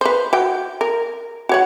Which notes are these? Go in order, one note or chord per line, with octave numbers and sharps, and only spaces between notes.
B4 C5
F#4 G5
A#4
F#4 C#5 F#5